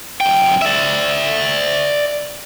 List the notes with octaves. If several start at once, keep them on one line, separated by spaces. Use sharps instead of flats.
F#2 G5
D5 E5